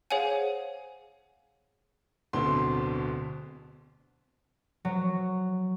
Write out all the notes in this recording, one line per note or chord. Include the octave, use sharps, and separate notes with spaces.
G#4 C5 C#5 F5 F#5 G#5
D1 D2 B2 D3 C4 C6
F#3